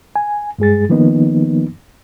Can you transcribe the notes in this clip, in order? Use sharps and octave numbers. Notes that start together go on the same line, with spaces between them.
G#5
G2 G#3 G#4 A6
D#3 F3 A#3 B3 D#4